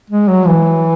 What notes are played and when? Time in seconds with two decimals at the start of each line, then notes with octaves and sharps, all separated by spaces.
0.10 G#3
0.28 F#3
0.47 E3